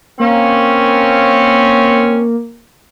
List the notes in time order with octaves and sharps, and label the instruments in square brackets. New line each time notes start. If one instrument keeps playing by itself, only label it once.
[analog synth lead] A#3 [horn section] C4 C#4